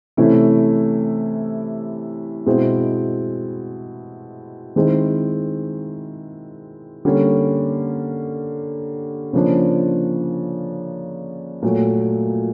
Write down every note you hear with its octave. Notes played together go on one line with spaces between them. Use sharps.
C3 E3 A3 C#4 E4
B2 G#3 C4 E4
D#3 G#3 C4 E4
D3 G3 A#3 C#4
C#3 F3 A#3 D4
A#2 F#3 A3